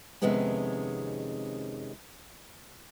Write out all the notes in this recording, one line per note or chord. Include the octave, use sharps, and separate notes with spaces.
F2 C3 D#3 G#3 B3 C#4